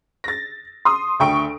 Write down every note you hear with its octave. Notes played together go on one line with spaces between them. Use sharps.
A6 A#6
C6 D#6
D2 G5 C#6 D7